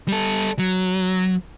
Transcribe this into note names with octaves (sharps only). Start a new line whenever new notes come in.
G3 A4
F#3